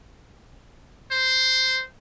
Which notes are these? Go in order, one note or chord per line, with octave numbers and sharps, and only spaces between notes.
C5